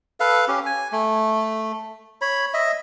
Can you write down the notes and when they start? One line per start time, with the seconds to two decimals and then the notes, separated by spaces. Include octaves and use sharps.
0.20 A4 B4 F5
0.48 C#4 G4
0.66 G#5
0.92 A3
2.21 C#5 B5
2.54 D#5 E5